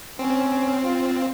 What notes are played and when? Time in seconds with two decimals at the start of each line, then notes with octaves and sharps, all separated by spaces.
0.19 C4 C#4
0.84 F4